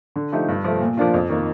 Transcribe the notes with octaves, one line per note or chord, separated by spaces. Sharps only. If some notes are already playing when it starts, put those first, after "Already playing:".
D3
F3 A3 D#4 G4
G2
F3 A3
A#2
F3 A#3 D4 F4
F2
D#3 A#3